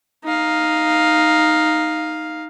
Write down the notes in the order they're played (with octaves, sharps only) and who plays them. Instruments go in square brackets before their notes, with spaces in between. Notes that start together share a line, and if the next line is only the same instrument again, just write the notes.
[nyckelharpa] D#4 F5